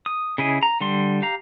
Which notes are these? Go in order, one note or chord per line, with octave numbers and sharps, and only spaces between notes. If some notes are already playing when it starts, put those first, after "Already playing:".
D#6
C#3 E4 G#4 D#5
A#5
D3 G3 C6
G4 F5 A#5